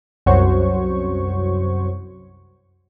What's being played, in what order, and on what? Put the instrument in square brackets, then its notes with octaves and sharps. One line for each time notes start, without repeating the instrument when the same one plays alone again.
[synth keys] C2 F#2 F#4 C5 C#5 C#6